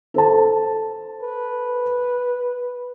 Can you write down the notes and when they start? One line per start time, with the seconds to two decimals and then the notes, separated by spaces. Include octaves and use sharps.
0.14 A4 C5 A5
1.22 B4